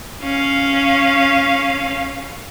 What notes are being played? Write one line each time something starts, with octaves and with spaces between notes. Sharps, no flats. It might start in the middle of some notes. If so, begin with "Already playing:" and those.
C#4 F5